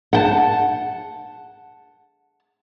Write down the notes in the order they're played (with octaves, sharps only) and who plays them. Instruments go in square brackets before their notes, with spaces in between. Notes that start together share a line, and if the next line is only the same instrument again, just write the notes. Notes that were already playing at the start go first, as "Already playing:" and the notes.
[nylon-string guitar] F#5 G5 A5